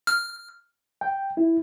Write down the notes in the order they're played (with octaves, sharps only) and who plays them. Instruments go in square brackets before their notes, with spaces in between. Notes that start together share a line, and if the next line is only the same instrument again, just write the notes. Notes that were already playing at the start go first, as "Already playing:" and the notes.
[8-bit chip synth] F6
[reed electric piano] G5
E4